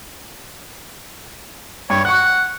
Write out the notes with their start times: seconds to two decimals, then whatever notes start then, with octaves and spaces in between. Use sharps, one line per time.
1.90 G2 C#5
2.05 F#5 C#6 F#6